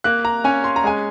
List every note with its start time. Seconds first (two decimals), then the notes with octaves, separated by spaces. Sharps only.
0.04 A#3 F#6
0.25 A#5
0.44 C#4 G#5
0.64 C6
0.76 A#5
0.84 G#3 G#5